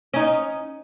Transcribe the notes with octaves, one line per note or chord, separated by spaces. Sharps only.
C#4 D#4